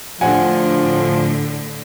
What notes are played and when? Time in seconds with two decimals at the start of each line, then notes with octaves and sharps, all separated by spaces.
0.21 A2 D3 F3 F#5 G#5